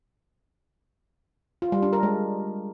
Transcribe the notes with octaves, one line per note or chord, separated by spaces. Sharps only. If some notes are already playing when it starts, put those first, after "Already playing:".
F4
G3
D4
A#4
G#3